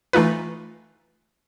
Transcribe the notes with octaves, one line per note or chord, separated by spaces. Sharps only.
E3 A3 D#4 F4 B4